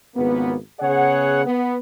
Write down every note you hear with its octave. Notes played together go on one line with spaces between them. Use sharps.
G#1 C#2 A#3 B3
C#3 B3 G#4 C#5 F#5
B3